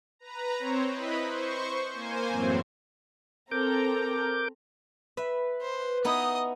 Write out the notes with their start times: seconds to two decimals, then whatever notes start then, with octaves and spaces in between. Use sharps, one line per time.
0.19 B4 A#5
0.59 C4 C5 C#5
0.90 E4 B4 D#5 B5
1.26 C5 C#6
1.93 A#3 C5 G#5
2.29 F#2 A2 E3 F#3 C4
3.51 C4 A4 A#4 A#5 D6 G6
5.17 B4 E5
5.61 C5
6.05 B3 D#4 E4 D#5 D#6